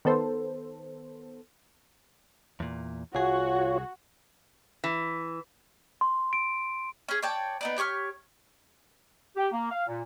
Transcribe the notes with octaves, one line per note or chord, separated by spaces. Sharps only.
D#3 B3 A4 C5
E2 A#2
C2 F4 F#4 G#4 C#5
E3
C6
D7
C#4 G#4
C#5 D5 G5 A5
B3 D#4 D5
G4 C#5 C#6 F6
G4
A#3
F5
A#2